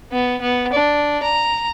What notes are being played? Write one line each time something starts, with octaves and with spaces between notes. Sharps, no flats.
B3
B3
D4
A#5